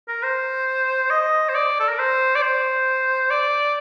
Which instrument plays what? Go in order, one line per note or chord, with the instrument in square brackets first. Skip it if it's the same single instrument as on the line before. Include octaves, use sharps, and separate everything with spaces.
[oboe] A#4
C5
D#5
C5
D5
A4
A#4
C5
D5
C5
D5